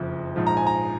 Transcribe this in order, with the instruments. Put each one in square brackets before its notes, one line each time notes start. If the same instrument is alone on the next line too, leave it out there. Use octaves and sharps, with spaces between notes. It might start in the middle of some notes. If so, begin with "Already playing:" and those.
Already playing: [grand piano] F#1 F2 F3
A#1 G#2 F3
A#5
G#5
A#5